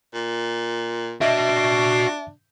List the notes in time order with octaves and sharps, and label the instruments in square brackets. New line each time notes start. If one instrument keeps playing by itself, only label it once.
[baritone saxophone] A#2
[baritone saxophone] D4 [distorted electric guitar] F#4 D#5 [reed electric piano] E5